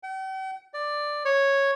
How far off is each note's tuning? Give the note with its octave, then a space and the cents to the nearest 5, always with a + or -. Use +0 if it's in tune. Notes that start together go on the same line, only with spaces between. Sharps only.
G5 -45
D5 +5
C#5 -5